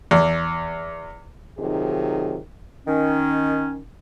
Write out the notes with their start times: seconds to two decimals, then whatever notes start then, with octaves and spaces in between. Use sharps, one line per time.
0.11 E2
1.58 C3 D#3 F#3 D#4 F4 G#4
2.87 D#3 C#4